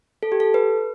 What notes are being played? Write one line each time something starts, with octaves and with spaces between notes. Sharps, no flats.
A4
G4
A4
B4